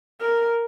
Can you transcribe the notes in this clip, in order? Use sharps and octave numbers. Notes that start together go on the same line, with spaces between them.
A#4